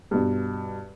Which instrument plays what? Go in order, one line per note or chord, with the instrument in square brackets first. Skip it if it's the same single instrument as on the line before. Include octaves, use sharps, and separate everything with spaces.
[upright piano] G2 B2